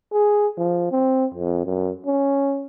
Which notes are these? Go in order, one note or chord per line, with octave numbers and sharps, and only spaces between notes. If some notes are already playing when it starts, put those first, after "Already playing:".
G#4
F3
C4
F2
F#2
C#4